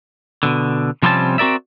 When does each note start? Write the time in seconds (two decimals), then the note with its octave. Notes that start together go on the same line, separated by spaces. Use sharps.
0.43 B2 D3
1.02 C3 F3 G3 C4 C#4 A5
1.38 C4 F#4 A#4 D5 E5